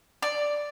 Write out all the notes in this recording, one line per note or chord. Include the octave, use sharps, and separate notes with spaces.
D5